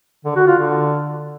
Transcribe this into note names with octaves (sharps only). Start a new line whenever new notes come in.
D3
F#4
F4
D3